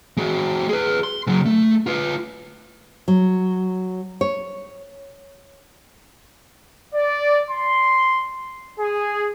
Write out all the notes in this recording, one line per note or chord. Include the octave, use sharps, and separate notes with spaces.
G#3 F#4
G#4 B4
C6
C#3 F#3
A3
F4 B4
F#3
C#5
D5
C6
G#4